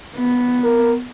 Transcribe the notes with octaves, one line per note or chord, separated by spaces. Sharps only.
B3
A#4